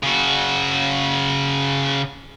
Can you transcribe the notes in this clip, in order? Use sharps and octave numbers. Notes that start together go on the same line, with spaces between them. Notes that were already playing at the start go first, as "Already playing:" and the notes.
C#3 F#4